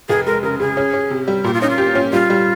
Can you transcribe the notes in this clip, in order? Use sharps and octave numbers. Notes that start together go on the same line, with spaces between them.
F1 G#4
G#3 A#4
C#3 A#4
C#3 G#4
C#4
C#4
C3
G3
A#2 G4
F4
C#4 D#4
F4
G4
C#4
G3 F4
G3